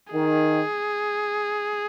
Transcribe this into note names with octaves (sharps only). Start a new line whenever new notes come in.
D#3 G#4